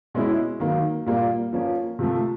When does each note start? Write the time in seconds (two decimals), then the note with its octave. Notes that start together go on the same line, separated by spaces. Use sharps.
0.14 B2 G#3 C#4 E4
0.60 D#3 F#3 A#3
1.06 A#2 G3 A#3
1.53 F3 A#3 C#4
1.99 C3 F3 A3